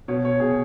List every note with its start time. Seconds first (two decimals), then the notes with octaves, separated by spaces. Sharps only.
0.08 B2 C#5
0.25 C#5
0.40 B2 G#4